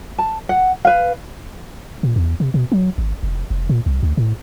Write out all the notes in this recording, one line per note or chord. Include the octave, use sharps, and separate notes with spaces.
A5
F#5
B4 F5
A#2
E2
C3
B2
F#3
G#1
F1
F1
A#2
C2
D2
A2